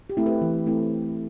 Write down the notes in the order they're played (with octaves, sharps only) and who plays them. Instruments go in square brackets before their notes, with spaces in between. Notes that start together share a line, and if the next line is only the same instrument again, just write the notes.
[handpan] G4
A3 C4 E4
G4 B4
E3
A3 C4 E4